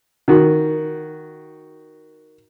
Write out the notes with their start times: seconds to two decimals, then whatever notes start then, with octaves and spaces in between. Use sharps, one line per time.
0.28 D#3 F#4